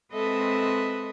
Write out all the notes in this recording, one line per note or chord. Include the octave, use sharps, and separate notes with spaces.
G#3 C4 A4 B4 D#5 E5